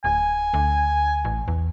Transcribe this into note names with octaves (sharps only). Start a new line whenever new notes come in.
D1 G#5
D2
A1
E2